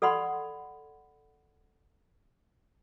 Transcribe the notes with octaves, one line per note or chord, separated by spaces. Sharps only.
A4 D5 F#5 B5 C6